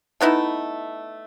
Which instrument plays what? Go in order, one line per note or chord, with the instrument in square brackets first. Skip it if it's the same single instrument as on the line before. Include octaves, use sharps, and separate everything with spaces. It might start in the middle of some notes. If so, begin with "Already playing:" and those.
[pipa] A3 B3 D#4 E4